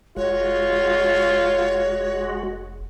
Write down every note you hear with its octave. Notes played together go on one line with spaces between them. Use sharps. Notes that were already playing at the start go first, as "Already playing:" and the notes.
F1 G#3 F4 F#4 C#5